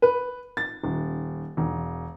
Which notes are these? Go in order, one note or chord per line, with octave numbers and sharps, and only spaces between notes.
B4
A6
D#1
E1